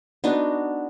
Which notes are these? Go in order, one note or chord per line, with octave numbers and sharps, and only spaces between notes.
B3 D4 D#4 F#4